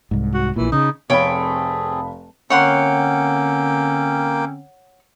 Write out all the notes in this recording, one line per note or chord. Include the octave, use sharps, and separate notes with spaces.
C2 G#2
F#4
A#1 A#2 E3
C#3 D#4
F1 A3 C4 G#4 C#5 F5 G5 B5
D3 A#3 C4 C#4 C#5 F#5 G5 C6